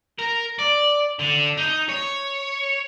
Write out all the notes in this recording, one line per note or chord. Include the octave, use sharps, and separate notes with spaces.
A#4
D5
D3
D#4
C#5